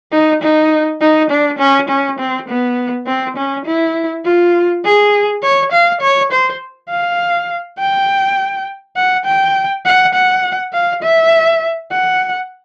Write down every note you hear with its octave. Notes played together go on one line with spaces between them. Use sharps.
D#4
D#4
D#4
D4
C#4
C#4
C4
B3
C4
C#4
E4
F4
G#4
C#5
F5
C#5
C5
F5
G5
F#5
G5
F#5
F#5
F5
E5
F#5